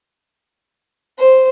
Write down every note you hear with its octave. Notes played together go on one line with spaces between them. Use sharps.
C5